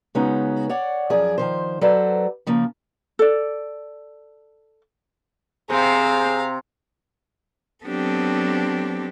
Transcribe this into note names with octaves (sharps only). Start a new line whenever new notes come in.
C#3 G#3 B3 C#4 D#4 F#4
C#5 D5 F#5
F#2 F3 G#4 D5
D#3 F3 C5
F#3 A4 B4 C5 D5
C#3 F3 A#3
A4 D5
C3 C4 G#4 C5 F5 A#5
F#3 B3 C4 D4 G4 A4